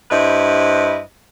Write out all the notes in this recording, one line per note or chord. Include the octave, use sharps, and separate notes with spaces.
G2 E4 B4 C5 D#5